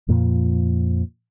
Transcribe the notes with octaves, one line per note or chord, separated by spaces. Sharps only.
F2 A#2 F3